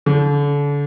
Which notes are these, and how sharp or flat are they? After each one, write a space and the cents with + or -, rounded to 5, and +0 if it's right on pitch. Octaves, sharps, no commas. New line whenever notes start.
D3 -35